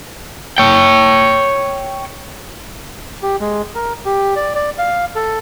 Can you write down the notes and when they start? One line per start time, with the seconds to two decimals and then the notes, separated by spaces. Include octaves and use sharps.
0.58 C#5 G5
3.23 G4
3.41 G#3
3.75 A#4
4.05 G4
4.36 D5
4.55 D5
4.78 F5
5.16 A4